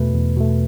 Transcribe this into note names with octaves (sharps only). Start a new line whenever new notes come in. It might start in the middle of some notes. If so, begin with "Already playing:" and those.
Already playing: E2 B2 A3 B4
E2
B2 A3